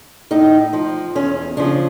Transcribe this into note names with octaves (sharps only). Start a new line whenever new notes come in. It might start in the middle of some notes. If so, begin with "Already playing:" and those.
A2 D#4
F3
E2 C#4
C#3 F3 D4